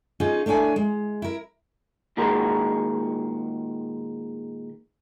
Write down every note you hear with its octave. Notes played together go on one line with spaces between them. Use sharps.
C#4 D#4 F4 G#4
A3 D4 E4 C#5 G#5
G#3
E4 A#4
A#2 D#3 G#3 F#4 A#4